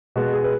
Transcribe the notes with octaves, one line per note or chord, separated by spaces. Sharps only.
B2 G#3 B3 F#4
G#4
B4